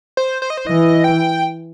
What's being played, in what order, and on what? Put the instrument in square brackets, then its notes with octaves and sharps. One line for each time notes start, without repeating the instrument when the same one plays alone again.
[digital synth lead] C5
C5
D#5
C5
[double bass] E3 [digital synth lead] D#5
[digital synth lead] G5